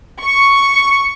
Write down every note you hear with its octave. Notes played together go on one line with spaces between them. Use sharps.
C#6